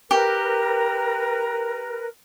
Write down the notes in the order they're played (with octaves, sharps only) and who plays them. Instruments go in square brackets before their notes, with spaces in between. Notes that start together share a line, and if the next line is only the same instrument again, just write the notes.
[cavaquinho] G4 [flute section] A#4 B4